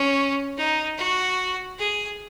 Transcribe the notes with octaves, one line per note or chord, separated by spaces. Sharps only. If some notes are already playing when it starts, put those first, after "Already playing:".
Already playing: C#4
D#4
F#4
G#4